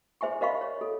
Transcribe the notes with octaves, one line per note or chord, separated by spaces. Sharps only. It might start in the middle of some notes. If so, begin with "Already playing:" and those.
G#4 C5 E5 G#5 C#6
A#4 C5 D#5 F5 B5 C#6
C#5
A4 D#5